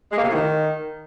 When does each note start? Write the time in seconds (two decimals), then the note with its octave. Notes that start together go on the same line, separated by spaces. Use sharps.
0.12 G#3
0.17 A#3
0.23 C3
0.28 A2
0.34 D#3